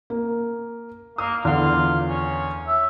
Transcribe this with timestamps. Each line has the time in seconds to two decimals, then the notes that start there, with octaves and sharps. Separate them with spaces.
0.10 A#3
1.18 A#3 D#6
1.45 E2 D3 F4 F#5
2.07 C#4
2.68 E5